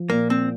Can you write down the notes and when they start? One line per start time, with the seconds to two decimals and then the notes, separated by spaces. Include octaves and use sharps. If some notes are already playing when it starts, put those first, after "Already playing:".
Already playing: F3
0.09 A#2 A#3
0.30 C4